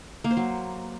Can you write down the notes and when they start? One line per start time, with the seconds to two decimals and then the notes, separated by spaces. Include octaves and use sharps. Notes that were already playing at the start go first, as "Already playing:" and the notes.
0.24 A#3
0.31 C5
0.37 F#3